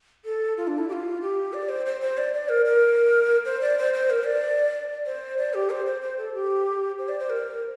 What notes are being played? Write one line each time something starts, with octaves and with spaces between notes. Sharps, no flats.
A4
F4
D4
E4
G4
F4
G4
D5
C5
C5
C5
D5
D5
A#4
A#4
C5
D5
C5
C5
A#4
D5
C5
D5
G4
C5
C5
C5
A4
G4
C5
D5
C5
A#4